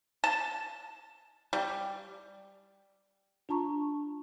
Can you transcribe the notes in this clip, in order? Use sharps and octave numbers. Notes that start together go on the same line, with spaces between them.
A5
G3
D4 F4 A5 A#5 C#6